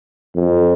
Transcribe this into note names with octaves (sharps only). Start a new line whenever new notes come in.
F2